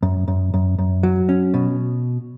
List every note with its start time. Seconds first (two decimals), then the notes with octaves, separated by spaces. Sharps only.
0.03 F#2
0.28 F#2
0.54 F#2
0.78 F#2
1.03 F#3
1.29 C#4
1.54 B2